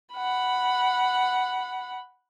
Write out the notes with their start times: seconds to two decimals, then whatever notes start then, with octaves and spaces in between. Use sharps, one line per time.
0.15 F#5 B5